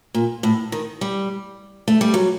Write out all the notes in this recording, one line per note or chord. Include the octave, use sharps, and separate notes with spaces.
A#2
A2
D#3
G3
A3
G3
F#3